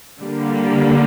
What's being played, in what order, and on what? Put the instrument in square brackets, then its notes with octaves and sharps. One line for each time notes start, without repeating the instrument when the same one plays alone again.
[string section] D3 G3 A#3